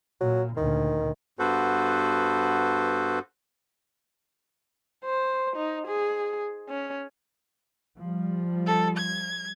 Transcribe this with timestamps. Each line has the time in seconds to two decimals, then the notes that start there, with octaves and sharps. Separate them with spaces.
0.21 A#2 F#3
0.57 D2 A#2 D#3
1.39 G2 B3 F#4 A4 B4 C5
5.05 C5
5.56 D#4
5.87 G#4
6.69 C#4
7.97 F3 G3
8.66 A4
8.97 G#6